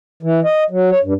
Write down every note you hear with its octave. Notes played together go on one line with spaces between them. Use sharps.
E3
D#5
F#3
C#5
G2